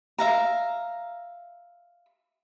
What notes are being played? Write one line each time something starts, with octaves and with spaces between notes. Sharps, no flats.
E5 F5 A#5